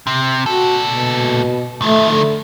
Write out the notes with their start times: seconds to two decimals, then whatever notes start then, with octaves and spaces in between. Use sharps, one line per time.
0.07 C3
0.46 A#2 F#4 A4
0.87 B2
1.82 D#3 F3 A3
2.10 D3